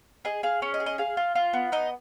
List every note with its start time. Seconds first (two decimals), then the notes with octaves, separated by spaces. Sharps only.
0.25 G#4 D#5
0.43 G#4 F5
0.62 C#4 C#5
0.74 D#5
0.80 G#4
0.86 D#5
0.98 G#4 F5
1.17 F4
1.35 F4
1.53 B3
1.72 D#4 D#5